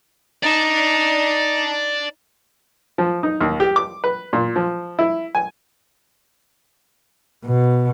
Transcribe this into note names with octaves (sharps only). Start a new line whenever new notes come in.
D#4 D5 A5
F3
D#4
D#2
G4
D6
B4
A#2
F3
E4
G#5
B2